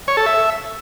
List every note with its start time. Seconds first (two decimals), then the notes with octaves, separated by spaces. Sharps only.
0.08 C#5
0.17 A4
0.26 E5